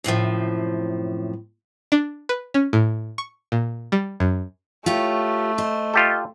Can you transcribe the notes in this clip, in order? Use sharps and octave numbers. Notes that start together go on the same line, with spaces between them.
F#2 A2 C3 F3
D4
B4
C#4
A2
C#6
A#2
G3
F#2
A3 F4 G4 C#5
C5 D#5
F4 G4 A4